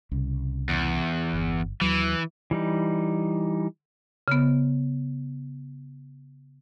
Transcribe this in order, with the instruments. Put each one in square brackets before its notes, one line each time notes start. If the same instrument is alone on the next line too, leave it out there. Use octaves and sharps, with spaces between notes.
[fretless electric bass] C2 C#3
[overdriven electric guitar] E2
[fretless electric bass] G1
[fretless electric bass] D#2 F#3 [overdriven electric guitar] E3
[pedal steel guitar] E3 G3 D#4
[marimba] C#3 B3